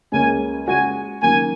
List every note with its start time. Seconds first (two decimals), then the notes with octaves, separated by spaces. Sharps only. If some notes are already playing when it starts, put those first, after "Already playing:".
0.12 C#2 C#3 A#3 C#4 G#5
0.67 C#3 G#3 F#4 G#5
1.22 F#2 D#3 A#3 G#5